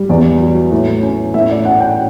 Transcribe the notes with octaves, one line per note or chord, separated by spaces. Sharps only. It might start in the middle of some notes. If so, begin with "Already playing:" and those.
Already playing: G3
E2 D5
F#3
A2
C#4
A2 E5
D5
C#4 F#5
G5